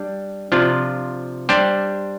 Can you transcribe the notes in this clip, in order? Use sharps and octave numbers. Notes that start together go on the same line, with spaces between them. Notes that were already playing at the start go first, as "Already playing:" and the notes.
Already playing: G3 D4
C3 F3 D4 F4
G3 D4 G4 C5